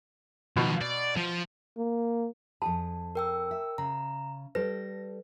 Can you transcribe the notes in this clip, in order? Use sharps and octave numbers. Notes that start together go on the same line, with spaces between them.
B2 D#3 F3
D5
F3
A#3
F2 G#4 A5
A#4 G5 E6
E5
C#3 A#5
G3 A4 B4 A#6